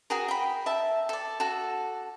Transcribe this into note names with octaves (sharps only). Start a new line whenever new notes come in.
F#4 G#4 A#4
G5 B5
E5 A5
A4 D5
F#4 A4